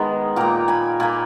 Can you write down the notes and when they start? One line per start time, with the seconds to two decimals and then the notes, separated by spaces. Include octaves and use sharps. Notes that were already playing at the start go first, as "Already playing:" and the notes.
Already playing: D#3 G#3 B3
0.36 A#2 A#3 G5 A#5
0.68 G#5 B5
1.00 A#2 A#3 G#5 B5